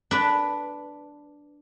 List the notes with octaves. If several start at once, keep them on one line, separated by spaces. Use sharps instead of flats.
D4 B4